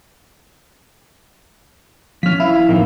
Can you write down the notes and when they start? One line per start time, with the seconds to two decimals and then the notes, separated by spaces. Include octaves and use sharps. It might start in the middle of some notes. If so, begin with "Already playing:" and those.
2.23 F3 C#4 F6 B6
2.40 E4 B4 F5
2.69 A1 F2 D#3 A#3 C4 F4